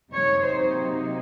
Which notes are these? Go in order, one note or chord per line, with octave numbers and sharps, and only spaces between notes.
C3 F#3 A#3 D#4 C#5
C5